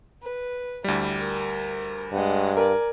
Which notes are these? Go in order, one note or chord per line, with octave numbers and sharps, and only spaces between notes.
B4
D2 G3 E4
A#4
G2 G#3 F#5
A#4 D5 G#5